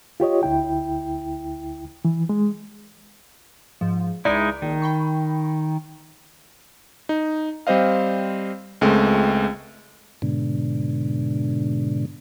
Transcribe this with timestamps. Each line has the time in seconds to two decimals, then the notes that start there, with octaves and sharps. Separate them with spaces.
0.20 F4 G4 C#5 D#5
0.43 D2 E4 G5
2.05 E3
2.29 G#3
3.81 G#2 F3
4.25 C#2 G#3 D#4 E4 D5
4.62 A#1 D#3
4.82 G5 B5 C#6
7.09 D#4
7.67 G3 C4 C5 D#5 F5
8.81 C#2 G#3 A3 C4
10.22 G#2 B2 D3